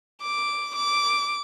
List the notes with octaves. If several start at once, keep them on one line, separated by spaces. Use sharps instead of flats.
D6
D6